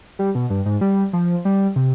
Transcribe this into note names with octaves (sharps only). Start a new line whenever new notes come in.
G3
B2
G2
G#2
G3
F3
G3
C3